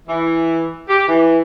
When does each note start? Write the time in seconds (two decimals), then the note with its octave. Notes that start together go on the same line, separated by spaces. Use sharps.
0.08 E3
0.89 G4
1.08 E3